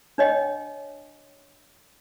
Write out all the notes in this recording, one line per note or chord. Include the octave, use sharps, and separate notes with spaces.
D4 C#5 D#5 G5